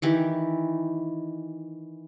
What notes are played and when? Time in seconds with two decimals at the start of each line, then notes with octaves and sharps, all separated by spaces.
0.02 D#3 E3 G4